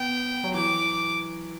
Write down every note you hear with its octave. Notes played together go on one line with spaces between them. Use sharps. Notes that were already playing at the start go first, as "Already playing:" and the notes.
Already playing: B3 G5
F#3
E3 D6